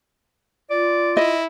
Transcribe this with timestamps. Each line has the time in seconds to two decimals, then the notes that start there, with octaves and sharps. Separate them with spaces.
0.70 F4 D5
1.17 E4 D#5